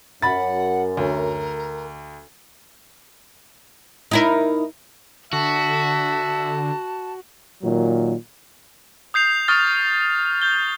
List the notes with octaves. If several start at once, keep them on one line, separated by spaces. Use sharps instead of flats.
F#2 F#5 B5 A6
D2 A#4
D#4 E4 A#4
D3 F#4 E5 A5
A#2 D#3 F#3
D#6 G6 C7 F7
C#6 D#6 F6 A6
G6 G7